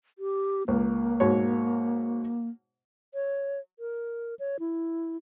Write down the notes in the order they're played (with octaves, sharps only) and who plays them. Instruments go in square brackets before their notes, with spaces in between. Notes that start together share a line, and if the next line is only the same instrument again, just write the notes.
[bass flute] G4
[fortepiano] C#2 [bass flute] A#3
[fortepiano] G#2 B2 C#5
[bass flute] C#5
A#4
C#5
E4